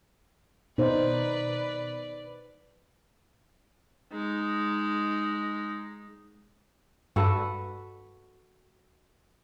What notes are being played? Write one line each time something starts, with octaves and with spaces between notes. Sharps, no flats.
B2 D#4 B4 C5 D5
G#3 D#4
G2 F#4 A4 B4